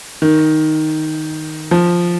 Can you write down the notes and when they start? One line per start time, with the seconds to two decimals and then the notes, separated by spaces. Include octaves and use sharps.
0.22 D#3
1.71 F3